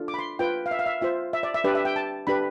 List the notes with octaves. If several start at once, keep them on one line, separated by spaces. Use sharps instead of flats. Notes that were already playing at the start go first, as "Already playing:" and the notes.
Already playing: D4 F4 A4
D6
B5
C6
F4 B4 G5
F5
E5
F5
E5
F4 C5 E5
E5
D5
E5
D4 G4 B4 D5
E5
G5
A5
D4 G4 B4 B5